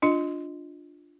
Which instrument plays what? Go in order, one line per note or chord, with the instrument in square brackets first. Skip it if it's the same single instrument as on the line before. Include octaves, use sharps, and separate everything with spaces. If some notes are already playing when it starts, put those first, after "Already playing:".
[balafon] D4 F4 D#5